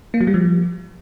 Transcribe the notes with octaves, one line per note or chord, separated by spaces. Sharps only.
A#3
F#3
G3
F3